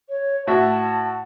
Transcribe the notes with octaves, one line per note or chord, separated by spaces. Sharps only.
C#5
A2 F#4 E5 A5